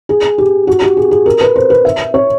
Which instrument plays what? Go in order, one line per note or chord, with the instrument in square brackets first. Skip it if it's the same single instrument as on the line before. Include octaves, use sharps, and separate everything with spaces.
[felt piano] G#4
G4
F#4
G4
G#4
G#4
A#4
B4
C5
B4
E5
C#5